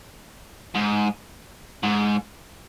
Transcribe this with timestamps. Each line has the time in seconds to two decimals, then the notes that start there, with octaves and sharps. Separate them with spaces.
0.75 G#2
1.83 G#2